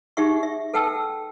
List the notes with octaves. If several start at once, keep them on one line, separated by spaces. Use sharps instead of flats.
D#4 G4 G#4 E5 F#5 C#6
E5
A4 B4 F#5 G5 A5 E6